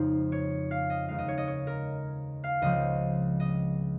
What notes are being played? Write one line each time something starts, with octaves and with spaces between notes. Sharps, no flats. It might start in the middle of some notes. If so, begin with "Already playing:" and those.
Already playing: F2 C#3 G#3 D#4 C5
C#5
F5
D#5
D#2 C#3 G#3 D#4 F5
D#5
C#5
D#5
C#5
A#4
F5
C#2 C#3 F3 C4 D#5
D#5